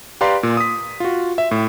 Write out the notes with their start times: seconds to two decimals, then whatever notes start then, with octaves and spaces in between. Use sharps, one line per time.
0.21 G4 B4 D5 F5 A#5 C6
0.43 A#2
0.57 D#6 B6
1.00 F4 F#4
1.38 E5
1.51 A2